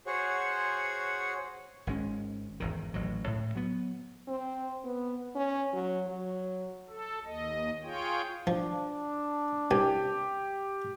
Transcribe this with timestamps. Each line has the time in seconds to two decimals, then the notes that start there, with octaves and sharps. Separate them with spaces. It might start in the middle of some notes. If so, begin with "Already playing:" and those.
0.06 F#4 G#4 C5 C#5 F#5 C#6
1.87 G#1 G#3 C#4
2.60 G#1 E2 D#3
2.94 A1 A2 F#3
3.25 D2 A2
3.55 F#3 B3
4.28 C4
4.84 B3
5.36 C#4
5.73 F#3
6.07 F#3
6.89 A4
7.25 D#2 D#5
7.83 F4 G#4 C#5 G5
8.47 F3 D4
9.71 C2 G4 G#5